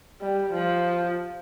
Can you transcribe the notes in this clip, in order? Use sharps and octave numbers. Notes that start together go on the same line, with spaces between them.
G3
F3